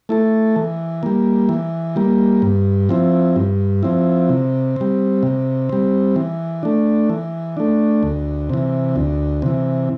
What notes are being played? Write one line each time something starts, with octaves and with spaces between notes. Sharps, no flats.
A3 E4 A4
E3
G3 A#3
E3
G3 A#3
G2
F3 C4 E4
G2
F3 C4 E4
C3
G3 C4
C3
G3 C4
E3
A3 D4
E3
A3 D4
D2
C3 E3
D2
C3 E3